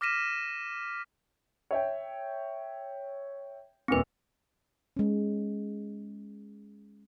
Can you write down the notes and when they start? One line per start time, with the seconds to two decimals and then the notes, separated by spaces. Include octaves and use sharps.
0.01 D6 F6 A#6 B6 D#7 E7
1.71 C#5 E5 G5
3.88 D#1 A#2 C4 B4 D6
4.97 G#3 C#4